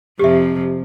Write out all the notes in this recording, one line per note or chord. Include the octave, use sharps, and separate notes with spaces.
F2 C3 F3 G4 E5